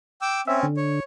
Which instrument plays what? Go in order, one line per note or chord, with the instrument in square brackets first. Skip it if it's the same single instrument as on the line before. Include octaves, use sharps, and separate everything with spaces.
[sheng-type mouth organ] G5 D6 E6
[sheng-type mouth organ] C4 C#4 [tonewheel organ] E5
[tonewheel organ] D3
[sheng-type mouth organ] C#5